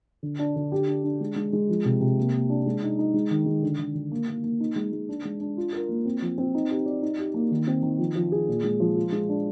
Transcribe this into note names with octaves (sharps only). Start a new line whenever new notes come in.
D3
D4
D3
G4
D4
D4
G#3
G#3
G#3
F3
C3
C3
A#3
A#3
D4
G#3
D#4
D#4
G#3
D#3
G#3
D3
D3
D3
A#3
A#3
A#3
D#4
G#3
G#3
D4
G#3
D4
F4
A#4
A#3
C4
F3
C4
D#4
G4
D5
D#4
G4
A#3
D#3
C4
D#3
F3
F3
G#4
A#2
G#3
F3
F4
G#3
D4